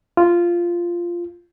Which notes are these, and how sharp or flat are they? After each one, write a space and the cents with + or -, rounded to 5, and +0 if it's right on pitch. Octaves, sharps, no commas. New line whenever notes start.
F4 -10